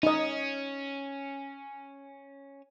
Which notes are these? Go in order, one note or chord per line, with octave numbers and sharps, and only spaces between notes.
C#4 D#4 D#5